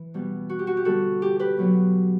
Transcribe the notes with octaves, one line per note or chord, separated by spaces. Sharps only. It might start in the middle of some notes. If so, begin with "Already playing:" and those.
Already playing: E3
B2 G3 B3
F#4
G4
F#4
G4
D3 G3 B3 F#4 A4
G4
G4 B4
B2 F#3 B3